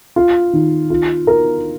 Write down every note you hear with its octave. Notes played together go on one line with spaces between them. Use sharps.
F4
D#3
F4
A#4